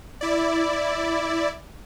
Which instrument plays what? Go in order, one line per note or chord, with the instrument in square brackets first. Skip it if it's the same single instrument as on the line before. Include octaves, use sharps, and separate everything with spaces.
[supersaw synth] E4 D5